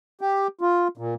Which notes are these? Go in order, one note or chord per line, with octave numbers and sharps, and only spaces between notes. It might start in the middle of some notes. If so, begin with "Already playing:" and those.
G4
F4
A#2